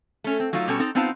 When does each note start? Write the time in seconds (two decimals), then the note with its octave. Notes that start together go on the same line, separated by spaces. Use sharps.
0.24 A3 C#4
0.40 C4
0.53 F#3 A3 D#4 F4
0.68 B2 G3 C#4 F#4 A4
0.79 C4 D#4 A4
0.95 B3 C4 D#4 F4 A5